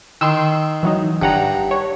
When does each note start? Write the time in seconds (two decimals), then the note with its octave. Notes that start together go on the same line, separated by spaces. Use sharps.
0.21 D#3 C6 E6
0.83 E3 F#3 D#4
1.22 G1 G2 F#5 A#5
1.71 C#5